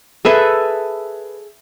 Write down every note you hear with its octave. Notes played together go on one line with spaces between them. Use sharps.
G#4 A4 B4 E5